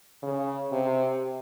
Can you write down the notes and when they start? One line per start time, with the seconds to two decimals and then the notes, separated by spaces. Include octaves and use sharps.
0.23 C#3
0.72 C3